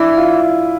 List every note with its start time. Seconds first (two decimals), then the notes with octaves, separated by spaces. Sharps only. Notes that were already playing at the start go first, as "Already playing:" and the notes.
Already playing: E3 D4 E4
0.17 F4